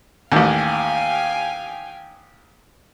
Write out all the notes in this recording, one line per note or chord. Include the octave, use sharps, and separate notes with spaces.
A1 D#2 F5 G5 G#5